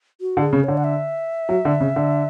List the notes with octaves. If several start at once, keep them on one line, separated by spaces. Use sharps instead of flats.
F#4
D3
G#4
C#3
D3 C#5
F#5
E5
F#3
D3
C#3
D3